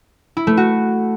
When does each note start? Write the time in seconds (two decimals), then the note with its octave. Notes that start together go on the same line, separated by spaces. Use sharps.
0.37 E4
0.47 A3
0.57 F#4